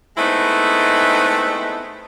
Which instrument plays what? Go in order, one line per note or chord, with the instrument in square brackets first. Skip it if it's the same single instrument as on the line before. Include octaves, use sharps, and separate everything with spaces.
[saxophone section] G#3 A3 B3 C4 D#4 E4